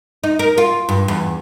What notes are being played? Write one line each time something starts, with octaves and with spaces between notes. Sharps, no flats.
D#4
A#4
F4
G2
E2